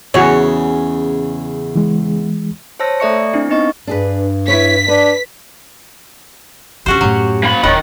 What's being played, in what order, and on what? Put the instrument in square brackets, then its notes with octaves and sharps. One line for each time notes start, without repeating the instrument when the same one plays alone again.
[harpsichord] E2 [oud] C#3 [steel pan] F#4 C#5
[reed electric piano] E3 G#3
[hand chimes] C5 C#5 A5 E6 A#6
A3 A4 D5 E5 C#6 C#7
C4 D4 E4
B3 C4 D#4 D#5 C#6
[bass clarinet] G2 [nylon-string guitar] D4 G#4 B4
[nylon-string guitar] E4 B4 C#5 [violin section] B6
[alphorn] D4 [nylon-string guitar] B4
[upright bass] F2 D3 [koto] C#4 F#4 C5 [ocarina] G4
[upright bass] F#2 A2 [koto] F#3
[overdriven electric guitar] A#3 B5
[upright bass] D1 D#4 [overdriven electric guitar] D#3 [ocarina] C#5 [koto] F#5